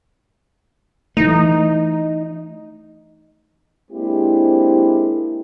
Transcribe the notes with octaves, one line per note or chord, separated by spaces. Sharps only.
E3 A3 D#4
G#3 A#3 C4 D4 E4 G4